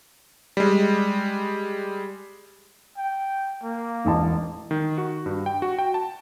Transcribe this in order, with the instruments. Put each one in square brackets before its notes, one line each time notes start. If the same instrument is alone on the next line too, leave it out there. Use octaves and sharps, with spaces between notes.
[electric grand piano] G3 G#3
[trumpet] G5
A#3
[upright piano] E1 A1 A5
[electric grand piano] D#3
F#4
G2
G5
F#4
G5
A5